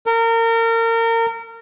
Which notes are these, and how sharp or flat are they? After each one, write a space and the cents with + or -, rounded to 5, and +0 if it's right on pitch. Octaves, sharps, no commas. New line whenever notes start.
A#4 -30